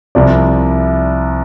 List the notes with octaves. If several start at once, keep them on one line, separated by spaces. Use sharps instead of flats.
C2 C3 F3 D5